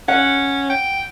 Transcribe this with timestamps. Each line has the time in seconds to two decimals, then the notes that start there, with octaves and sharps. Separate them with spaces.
0.08 C#4 F#5
0.70 G5